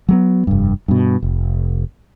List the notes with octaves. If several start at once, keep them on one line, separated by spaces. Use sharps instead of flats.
F#3 G#3 B3
F1 G2
G2 B2
F1